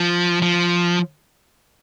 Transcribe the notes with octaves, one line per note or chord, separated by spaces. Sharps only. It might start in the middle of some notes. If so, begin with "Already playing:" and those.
Already playing: F3
F3